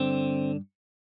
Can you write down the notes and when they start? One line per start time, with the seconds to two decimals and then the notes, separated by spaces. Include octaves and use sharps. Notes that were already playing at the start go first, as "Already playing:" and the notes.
Already playing: G2 D3 C4